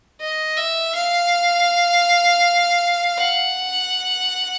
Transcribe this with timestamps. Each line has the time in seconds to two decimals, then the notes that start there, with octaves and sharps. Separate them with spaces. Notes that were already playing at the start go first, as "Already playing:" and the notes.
0.21 D#5
0.57 E5
0.95 F5
3.18 F#5